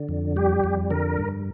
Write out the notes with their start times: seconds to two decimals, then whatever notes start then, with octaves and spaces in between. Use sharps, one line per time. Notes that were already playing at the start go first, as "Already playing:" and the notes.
Already playing: D3
0.09 F2
0.36 G3 G4
0.64 F2
0.90 D3 A#4
1.18 G2